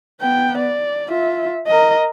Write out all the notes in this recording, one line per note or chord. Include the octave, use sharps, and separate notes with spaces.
B3 G5
D5
F4 E5
A#4 D#5